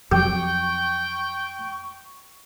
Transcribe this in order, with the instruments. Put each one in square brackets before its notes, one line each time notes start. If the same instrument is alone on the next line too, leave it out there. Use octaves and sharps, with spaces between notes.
[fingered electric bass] F2 C3 F#3 [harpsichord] G4 [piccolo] G5 [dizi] C#6